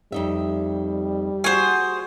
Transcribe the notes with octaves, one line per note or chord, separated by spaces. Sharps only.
F2 G3 D#4 E5
F#4 G#4 C5 G#5